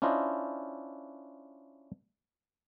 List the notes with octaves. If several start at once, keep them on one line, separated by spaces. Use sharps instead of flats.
C#4 D4 E4 F4 C5 D#5